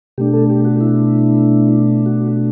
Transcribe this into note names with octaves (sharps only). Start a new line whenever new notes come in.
B2 A3 D4 G4
A4
G4
F#4
E4
F#4